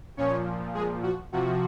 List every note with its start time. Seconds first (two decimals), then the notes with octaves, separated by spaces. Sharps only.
0.17 A#2 F3 C#4 C#5
0.74 G#3 G#4
1.03 F#4
1.32 C3 F3 F#4